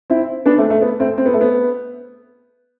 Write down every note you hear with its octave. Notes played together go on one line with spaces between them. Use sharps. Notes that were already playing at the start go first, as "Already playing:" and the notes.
C4 E4
B3 D4
A3 C4
A3
B3
A3 C4
C4
B3
A3
B3